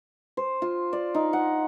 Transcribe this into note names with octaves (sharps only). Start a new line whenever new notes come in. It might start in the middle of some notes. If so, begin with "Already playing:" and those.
C5
F4
D5
D#4
F#5